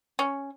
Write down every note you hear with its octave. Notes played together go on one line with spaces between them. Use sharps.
C#4